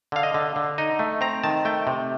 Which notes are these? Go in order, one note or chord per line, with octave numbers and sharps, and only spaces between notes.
D3 F5
D#5
D3
D3
D#4 D#5
A3
C4 A#5
D#3 A5
A3 G5
C3